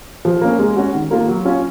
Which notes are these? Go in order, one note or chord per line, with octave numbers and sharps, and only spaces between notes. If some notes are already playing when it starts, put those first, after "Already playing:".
F3
A#3 C#4
G#3
C#4 F#4
D#3
A#3 F4 A#4
F#3
C#4 F4